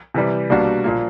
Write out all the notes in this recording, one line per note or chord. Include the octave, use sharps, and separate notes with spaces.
C3 E3 G3
B2 G3 A#3 D4 F#4
A#2 F3 A#3